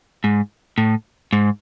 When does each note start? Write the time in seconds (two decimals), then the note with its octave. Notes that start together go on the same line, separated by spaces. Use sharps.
0.24 G#2
0.78 A2
1.33 G#2